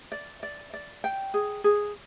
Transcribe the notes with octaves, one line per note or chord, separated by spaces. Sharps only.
D5
D5
D5
G5
G#4
G#4